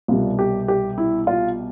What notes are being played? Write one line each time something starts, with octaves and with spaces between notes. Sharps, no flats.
C2 B2 G3 F4
G4
G4
E4
F4